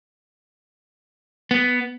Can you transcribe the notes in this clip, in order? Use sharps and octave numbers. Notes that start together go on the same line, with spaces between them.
B3